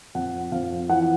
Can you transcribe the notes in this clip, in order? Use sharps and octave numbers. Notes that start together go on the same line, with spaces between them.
F2 F#5
F2 F5
E3 F#5